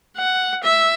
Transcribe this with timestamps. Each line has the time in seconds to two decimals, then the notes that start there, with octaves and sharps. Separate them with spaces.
0.18 F#5
0.63 E5